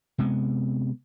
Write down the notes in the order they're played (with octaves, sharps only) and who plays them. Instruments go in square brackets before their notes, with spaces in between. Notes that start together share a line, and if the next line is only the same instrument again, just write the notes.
[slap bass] C3 G#3 B3